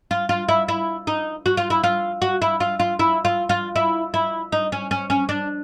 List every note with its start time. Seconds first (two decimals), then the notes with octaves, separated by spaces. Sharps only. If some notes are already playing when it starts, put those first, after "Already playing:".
0.11 F4
0.29 F4
0.49 E4
0.68 E4
1.07 D#4
1.46 F#4
1.57 F4
1.70 E4
1.84 F4
2.22 F#4
2.42 E4
2.60 F4
2.80 F4
2.99 E4
3.25 F4
3.49 F4
3.76 E4
4.14 E4
4.52 D#4
4.72 C#4
4.91 C#4
5.10 C#4
5.29 D4